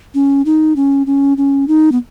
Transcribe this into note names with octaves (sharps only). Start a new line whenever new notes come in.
C#4
D#4
C#4
C#4
C#4
D#4
B3